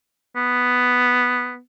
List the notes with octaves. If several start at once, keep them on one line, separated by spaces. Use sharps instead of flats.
B3